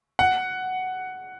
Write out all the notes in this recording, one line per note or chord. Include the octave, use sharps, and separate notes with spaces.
F#5